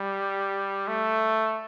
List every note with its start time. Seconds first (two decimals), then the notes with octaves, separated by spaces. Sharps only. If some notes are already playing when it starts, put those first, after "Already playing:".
Already playing: G3
0.88 A3